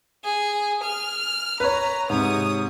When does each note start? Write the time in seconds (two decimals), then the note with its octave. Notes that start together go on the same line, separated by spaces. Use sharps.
0.25 G#4
0.84 F6
1.60 B4 C#5 A#5
2.10 G#2 C3 C#5 D#6